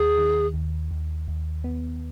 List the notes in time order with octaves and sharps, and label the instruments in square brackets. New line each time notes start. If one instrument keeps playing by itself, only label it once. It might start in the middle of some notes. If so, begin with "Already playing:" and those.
Already playing: [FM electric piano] D#2 D#3 [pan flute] G#4
[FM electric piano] D#3
D#2
D#2
D#2
B3